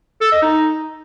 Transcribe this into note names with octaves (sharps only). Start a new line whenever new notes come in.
A4
D#5
D#4